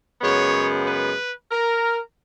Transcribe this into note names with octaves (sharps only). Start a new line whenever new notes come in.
F#2 C#3 G#3 B3 C#5
B4
A#4